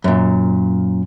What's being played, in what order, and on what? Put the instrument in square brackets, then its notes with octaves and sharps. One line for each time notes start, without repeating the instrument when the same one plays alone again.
[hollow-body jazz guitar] F#2 A#2